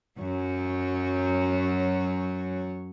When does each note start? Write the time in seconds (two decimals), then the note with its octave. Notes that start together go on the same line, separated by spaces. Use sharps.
0.19 F#2 F#3 C#5